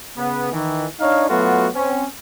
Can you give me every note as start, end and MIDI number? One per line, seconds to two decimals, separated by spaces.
0.18 0.51 49
0.18 0.51 59
0.53 0.86 51
0.53 0.86 52
1.00 1.25 62
1.00 1.25 63
1.00 1.25 73
1.00 1.25 77
1.30 1.68 54
1.30 1.68 57
1.30 1.68 59
1.30 1.68 65
1.30 1.68 66
1.75 2.05 60
1.75 2.05 61